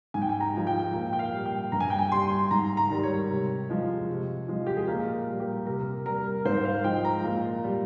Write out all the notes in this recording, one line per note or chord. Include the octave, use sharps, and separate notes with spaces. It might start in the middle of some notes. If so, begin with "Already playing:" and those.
G#2 G#5
G5
G#5
A#5
F3 G#3
G5
A#2 G5
G5
F5
G3
G5
G2 A#5
G#5
G5
G#5
G3 C6
G#2 A#5
A#5
D#3 G3
C#5
C3
F3 G#3
C3
F3 G#3
G4
G#4
A#2 A#4
G3
G4
C3 A#4
G3 A#4
G#2 C5
F5
F3 G#3 G5
A#5
A#2
G3